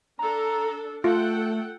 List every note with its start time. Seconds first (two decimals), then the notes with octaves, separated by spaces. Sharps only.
0.19 D4 A4 A#5
1.04 A3 F4 A4 F#5 G5